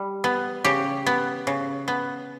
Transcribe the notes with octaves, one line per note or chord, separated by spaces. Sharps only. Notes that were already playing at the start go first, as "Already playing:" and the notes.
Already playing: G3
B3
C#3 G4
B3
C#3
B3